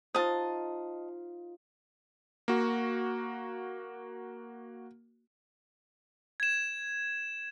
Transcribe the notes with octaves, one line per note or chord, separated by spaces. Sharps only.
D#4 F4 C5 D#5 A5
A#3 F#4
G#6 E7